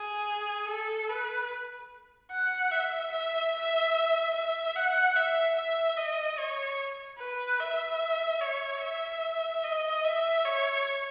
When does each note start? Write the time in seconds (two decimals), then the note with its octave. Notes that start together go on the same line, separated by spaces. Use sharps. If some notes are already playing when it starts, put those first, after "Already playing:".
Already playing: G#4
0.69 A4
1.09 B4
2.31 F#5
2.72 E5
3.12 E5
3.54 E5
4.35 E5
4.76 F#5
5.16 E5
5.57 E5
5.97 D#5
6.38 C#5
7.19 B4
7.60 E5
8.41 C#5
8.82 E5
9.64 D#5
10.04 E5
10.45 C#5